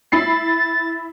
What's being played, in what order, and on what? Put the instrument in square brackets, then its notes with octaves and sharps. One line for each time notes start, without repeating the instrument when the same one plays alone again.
[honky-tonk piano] E4 B5 C7 [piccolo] A6